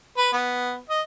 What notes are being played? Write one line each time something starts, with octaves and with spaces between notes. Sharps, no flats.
B4
B3
D#5